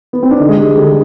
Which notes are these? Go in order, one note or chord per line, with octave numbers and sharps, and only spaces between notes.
B3
C4
D4
D3 D#4
G#3
G3
D3 G3